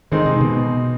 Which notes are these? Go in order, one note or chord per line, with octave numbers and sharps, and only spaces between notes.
D#3 G#3 C4 D#4
C3
B2